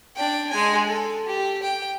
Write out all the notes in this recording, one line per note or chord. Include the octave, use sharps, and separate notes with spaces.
D4 G5
G#3 G#5
A4
G4
G5